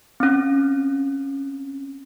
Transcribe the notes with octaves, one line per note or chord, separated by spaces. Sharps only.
C4 C#4